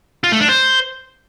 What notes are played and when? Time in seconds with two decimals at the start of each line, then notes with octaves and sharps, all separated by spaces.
0.24 F4
0.32 A3
0.41 D4
0.49 C5